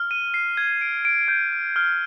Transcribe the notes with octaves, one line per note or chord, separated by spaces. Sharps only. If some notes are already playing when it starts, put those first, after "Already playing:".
Already playing: F6
D#7
C7
G#6
D7
D7
G6
D7
F6